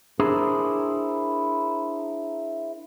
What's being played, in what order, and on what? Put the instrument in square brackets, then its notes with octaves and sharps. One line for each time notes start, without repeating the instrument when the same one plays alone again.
[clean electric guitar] D4 E4 G#4 A#4 C5